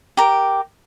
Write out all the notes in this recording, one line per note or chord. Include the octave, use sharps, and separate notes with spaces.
G4 A#4